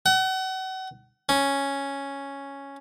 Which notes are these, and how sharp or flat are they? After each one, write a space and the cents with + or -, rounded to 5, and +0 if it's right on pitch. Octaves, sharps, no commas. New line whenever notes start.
F#5 +35
C#4 +0